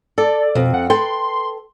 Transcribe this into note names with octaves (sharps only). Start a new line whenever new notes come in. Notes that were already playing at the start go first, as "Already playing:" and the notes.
A4 D5
F2 B2 C4
F#5
A4 B4 G5 C6